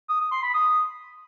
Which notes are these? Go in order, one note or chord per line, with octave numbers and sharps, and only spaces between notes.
D#6
D#6
C6
B5
D#6